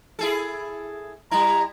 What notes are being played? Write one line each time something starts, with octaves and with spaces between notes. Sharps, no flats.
E4 G#4 A4
G3 E4 A#5